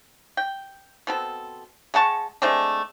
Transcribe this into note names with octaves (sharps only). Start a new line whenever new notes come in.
G5
B2 C4 A4
G#3 F#5 A5 C#6
G#3 A3 C4 D4